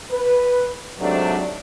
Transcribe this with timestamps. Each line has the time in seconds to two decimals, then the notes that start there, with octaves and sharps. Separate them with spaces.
0.11 B4
0.99 G#2 C3 F#3 A3 D4